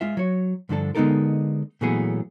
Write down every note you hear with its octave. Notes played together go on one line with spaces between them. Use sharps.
G#3 F4 E5
F#3 C#5
G2 D3 F3 D4 A4
D3 G#3 B3 D#4 A4 A#4
A#2 E3 F#3 A3 B3 G#4